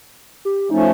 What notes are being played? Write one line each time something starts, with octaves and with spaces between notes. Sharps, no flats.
G4
F3 A3 C#4 D#4